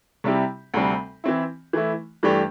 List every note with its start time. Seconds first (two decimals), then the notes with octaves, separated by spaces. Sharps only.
0.24 C3 G3 C4 E4 G4
0.74 D2 C3 G3 C4
1.24 E3 C4 E4
1.73 E3 A3 E4
2.23 G2 E3 A3 D4 G4